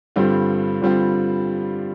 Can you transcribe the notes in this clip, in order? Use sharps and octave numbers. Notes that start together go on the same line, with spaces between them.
G2 D3 G3 C4 F4
G2 D3 G3 C4 F4